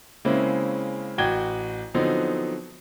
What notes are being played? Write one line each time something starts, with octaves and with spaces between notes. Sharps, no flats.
C#3 G#3 A#3 C4 C#4 E4
A1 F#4 G5 G#6 G7
D3 F3 F#3 B3 C4 D#4